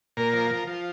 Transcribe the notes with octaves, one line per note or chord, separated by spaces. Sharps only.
A#2 A#4
F3
F3
F3